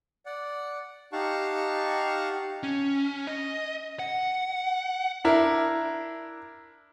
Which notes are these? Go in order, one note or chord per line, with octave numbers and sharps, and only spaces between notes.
D5 F#5
D#4 G4 F5 F#5 A5 C#6
C#4
D#5
F#5
D4 E4 A#4